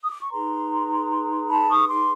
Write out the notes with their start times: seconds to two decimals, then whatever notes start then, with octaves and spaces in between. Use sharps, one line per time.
0.02 D#6
0.11 D6
0.21 C#6
0.30 D#4 G#4 B4 A#5 C6
1.49 A5 B5
1.69 C#6 D#6
1.89 C6 D6